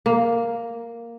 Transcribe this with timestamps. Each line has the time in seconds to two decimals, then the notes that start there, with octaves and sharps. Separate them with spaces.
0.06 A#3